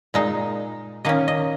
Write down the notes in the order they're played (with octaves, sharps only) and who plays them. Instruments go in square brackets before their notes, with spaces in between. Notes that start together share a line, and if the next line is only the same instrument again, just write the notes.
[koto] A#2 G#3 D#4
D#3 A#3 C#4 D#5
D#5